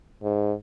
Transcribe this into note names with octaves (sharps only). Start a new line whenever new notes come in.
G#2